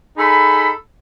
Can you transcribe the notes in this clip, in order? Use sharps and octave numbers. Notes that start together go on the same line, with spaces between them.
D#4 G#4 A4 B5